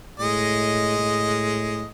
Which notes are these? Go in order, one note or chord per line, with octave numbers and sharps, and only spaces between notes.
A2 G#3 D#5
A2